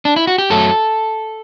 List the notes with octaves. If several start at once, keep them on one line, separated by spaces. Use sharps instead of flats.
D4
E4
F#4
G4
F#2 F#3 A3 A4